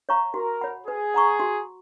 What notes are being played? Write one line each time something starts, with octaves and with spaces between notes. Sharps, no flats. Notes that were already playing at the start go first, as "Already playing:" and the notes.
C#5 F5 A#5 C#6
F#4 A#4
C#5 F#5 B5
G#4 B4
F#5 A#5 C#6
F#4